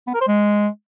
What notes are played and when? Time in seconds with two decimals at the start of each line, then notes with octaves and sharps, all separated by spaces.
0.08 B3
0.14 A#4
0.21 C5
0.28 G#3